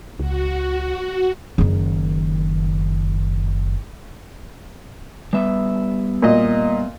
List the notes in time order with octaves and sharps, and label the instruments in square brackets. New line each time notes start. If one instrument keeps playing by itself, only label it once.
[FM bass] C#2 [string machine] F#4
[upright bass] F#1 D#3
[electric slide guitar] G3 B3 E5
[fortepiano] A#2 D#5